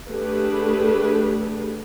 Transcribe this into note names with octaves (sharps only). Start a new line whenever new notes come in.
A3 D4 G4 G#4 B4